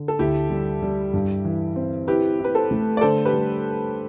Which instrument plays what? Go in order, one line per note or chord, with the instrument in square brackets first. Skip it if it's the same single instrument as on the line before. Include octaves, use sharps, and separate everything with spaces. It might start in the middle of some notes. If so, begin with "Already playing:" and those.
Already playing: [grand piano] D3
[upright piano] A4
[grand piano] D2 [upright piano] E4 G4
[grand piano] G3
G3
G2
E3
C4
[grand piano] E4 [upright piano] G4 B4
[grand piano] E4
[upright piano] B4
A4 C5
[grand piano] A3
[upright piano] D5
[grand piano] D3 [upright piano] A4 C5
[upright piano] G4 B4
[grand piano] G3